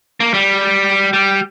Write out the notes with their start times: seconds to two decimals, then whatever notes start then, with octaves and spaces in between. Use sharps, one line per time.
0.20 A#3
0.34 G3
1.13 G3